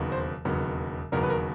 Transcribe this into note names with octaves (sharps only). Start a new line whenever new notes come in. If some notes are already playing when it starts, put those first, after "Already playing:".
Already playing: E1 D#2 C#3 F#3 B3
C5
E1 D#2 C#3 F#3 B3
E1 D#2 C#3 F#3 B3 A#4
B4
A#4